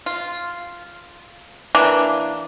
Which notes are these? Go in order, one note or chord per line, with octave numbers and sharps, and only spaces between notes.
F4
E3 A#3 D4